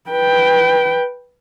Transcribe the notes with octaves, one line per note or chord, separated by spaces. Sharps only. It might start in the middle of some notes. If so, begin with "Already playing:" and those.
B4 G5